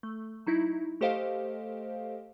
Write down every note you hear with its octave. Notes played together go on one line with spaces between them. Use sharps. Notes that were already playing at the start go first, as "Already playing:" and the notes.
A3
F#3 D#4 E4
A3 G4 A4 C5 D#5 F5